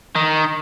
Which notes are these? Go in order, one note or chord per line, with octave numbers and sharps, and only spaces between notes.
D#3